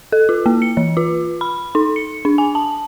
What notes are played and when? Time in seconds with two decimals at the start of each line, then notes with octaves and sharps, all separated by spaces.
0.12 A4
0.29 F4
0.46 A#3
0.62 C#7
0.77 E3
0.97 F4
1.41 B5
1.75 D#4
1.96 C#7
2.25 D4
2.38 G#5
2.55 A5